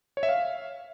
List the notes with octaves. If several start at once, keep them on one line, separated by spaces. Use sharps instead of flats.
C#5
E5
F5